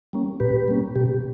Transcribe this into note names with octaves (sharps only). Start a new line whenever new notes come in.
G3 A#3 C#4
A#2 G4 B4
G3 A#3 C#4
B2 G4